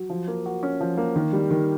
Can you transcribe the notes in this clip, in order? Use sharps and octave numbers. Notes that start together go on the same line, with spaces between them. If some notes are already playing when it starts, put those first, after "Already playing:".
Already playing: F#3
F3
A#3
F#4
C#4
F3
A#3
D#3
G3
D#3